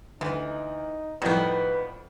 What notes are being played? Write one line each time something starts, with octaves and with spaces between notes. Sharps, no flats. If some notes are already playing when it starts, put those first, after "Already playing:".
D2 E3 D#4
F2 A2 D#3 G3 B3 B4